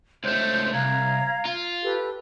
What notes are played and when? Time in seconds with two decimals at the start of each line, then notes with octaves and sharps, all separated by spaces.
0.24 C#2 A3 C5 C6 G6
0.73 C2 F5 A#5 G#6
1.45 F4
1.83 G4 A4 B4